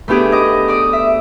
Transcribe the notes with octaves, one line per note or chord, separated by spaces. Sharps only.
A3 B3 D4 G4 G#4
D#5 D6
D5 D6 D#6
E5